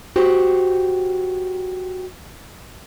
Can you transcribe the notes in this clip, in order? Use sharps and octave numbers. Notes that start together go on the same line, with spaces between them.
F#4 G4 C5